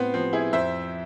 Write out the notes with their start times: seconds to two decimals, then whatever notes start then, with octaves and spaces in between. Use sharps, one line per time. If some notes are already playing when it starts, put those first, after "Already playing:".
Already playing: A2 B3 C4
0.14 F3 C4
0.33 E4 G#4
0.53 F2 C5 E5